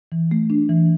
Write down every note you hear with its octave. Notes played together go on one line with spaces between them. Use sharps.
E3
A3
D4
E3